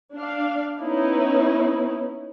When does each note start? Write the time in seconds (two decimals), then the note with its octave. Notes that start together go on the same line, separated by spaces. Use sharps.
0.14 D4 F5
0.79 B3 C#4 D#4 E4